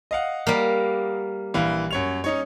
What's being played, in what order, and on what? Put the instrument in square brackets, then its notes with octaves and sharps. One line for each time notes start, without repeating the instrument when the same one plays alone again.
[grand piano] D#5 F5 F#5
[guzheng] G3 A#3
[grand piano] A#1 E3 F5
F#2 C#5 F7
C#4 D#4 C#5